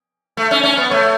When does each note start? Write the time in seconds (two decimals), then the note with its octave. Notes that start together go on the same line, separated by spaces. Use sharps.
0.37 A3
0.51 C#4
0.64 C#4
0.77 B3
0.90 A3 C#5